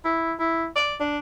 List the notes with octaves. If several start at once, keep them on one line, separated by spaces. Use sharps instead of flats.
E4
E4
D5
D4